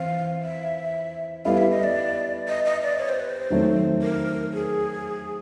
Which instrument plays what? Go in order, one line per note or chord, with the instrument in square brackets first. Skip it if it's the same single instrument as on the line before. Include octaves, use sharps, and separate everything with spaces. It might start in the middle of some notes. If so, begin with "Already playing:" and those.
Already playing: [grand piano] E3 C4 [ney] F5
[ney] E5
[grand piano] G3 B3 E4 A4 [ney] F5
[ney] E5
D#5
D5
D#5
D#5
D5
C#5
C5
B4
C5
[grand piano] D#3 F#3 A3 C4
[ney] A#4
G#4